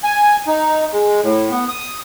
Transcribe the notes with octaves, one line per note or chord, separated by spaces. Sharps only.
G#5
D#4
G#3
A2
B3
D#6